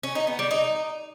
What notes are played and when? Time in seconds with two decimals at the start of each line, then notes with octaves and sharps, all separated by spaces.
0.03 C#4
0.15 D#4
0.27 B3
0.39 G3
0.51 D#4